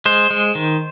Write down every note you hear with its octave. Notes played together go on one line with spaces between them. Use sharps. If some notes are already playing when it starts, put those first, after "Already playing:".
G#3 C5
G#3
D#3